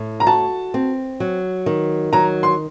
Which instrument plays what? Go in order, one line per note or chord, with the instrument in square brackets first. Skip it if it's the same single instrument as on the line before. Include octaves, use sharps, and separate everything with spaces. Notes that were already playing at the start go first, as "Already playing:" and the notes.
Already playing: [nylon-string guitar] A2
[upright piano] A#5
[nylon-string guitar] F#4 [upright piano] A5
[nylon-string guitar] C4
F#3
D#3
[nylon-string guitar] F#3 [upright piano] A#5
[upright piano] C6